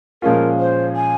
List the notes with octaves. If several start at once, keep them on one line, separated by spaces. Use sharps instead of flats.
A#2 F3 G#3 C#4 F4 A#4
C5
G#5